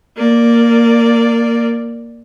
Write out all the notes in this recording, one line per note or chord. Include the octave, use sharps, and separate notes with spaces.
A#3 D5